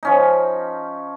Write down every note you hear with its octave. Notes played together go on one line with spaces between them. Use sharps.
F3 C#4 D#4